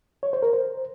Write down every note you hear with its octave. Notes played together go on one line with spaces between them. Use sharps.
C#5
C5
A#4
C5